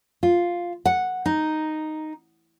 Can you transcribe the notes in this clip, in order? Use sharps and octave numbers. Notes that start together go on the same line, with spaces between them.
F4
F#5
D#4